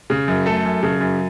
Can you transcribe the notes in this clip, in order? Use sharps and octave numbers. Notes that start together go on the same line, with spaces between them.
C#3
F#2
A3 A4
F#2
C#3
F#2